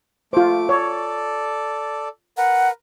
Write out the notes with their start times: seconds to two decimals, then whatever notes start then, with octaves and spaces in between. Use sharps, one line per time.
0.33 A3 F4 C5 D6
0.69 A4 C#5 D5
2.37 A#4 B4 F#5